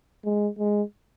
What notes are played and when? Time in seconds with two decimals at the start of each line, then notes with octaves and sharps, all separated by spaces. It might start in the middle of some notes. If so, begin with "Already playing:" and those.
0.24 G#3
0.58 G#3